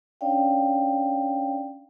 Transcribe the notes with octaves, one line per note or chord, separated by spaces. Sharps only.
C#4 D4 C#5 D5 F5 G5